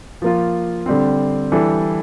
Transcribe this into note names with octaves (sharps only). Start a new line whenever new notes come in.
F3 A#3 F4
D3 G3 C4
E3 G3 D4 A4